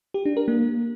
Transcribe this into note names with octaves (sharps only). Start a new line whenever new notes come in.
G4
D4
A#4
A#3